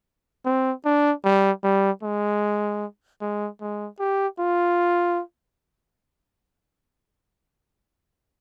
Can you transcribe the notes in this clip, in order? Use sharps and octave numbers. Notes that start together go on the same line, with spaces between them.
C4
D4
G3
G3
G#3
G#3
G#3
G4
F4